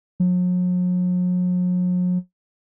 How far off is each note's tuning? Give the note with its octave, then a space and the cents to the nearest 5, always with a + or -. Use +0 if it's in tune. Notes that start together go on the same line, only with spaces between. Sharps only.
F#3 -45